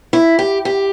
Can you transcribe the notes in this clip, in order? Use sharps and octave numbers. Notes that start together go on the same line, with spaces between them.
E4
G4
G4